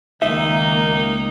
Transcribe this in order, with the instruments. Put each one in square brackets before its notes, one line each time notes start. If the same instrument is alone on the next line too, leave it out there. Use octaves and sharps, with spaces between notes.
[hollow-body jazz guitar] C#2 E5 [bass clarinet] D#3 [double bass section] A#3 [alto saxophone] D#4